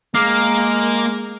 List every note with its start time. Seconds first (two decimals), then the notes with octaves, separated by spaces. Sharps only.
0.15 G#3 A#3 D6 F6 C7